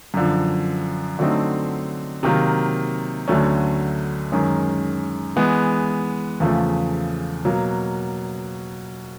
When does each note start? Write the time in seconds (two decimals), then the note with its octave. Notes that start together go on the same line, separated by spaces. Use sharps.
0.14 F#2 D3 F3
1.19 D3 F#3 A3 C4 D#4
2.23 C3 D#3 F#3 A#3
3.28 D2 D3 F#3 A3 C#4
4.32 F#2 D#3 G#3 C#4
5.36 E3 G#3 B3
6.40 E2 C#3 F3 A3
7.45 B2 F#3 A#3